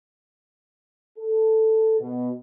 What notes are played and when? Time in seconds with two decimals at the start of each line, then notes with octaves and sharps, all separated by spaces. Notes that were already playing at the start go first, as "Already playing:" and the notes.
1.18 A4
2.00 B2